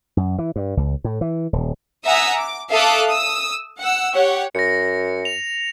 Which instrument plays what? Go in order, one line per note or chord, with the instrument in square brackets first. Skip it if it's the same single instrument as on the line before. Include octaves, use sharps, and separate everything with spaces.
[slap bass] F#2
E3
G2
C#2
A2
E3
D#1
[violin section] E5 F#5 G#5 A#5 D#6 E6
D6
A4 E5 F5 D6 D#6 F#6
D#6 E6
F#5 E6
G4 C#5 F#5
[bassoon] F#2 [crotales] A#6 C#7
[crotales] F7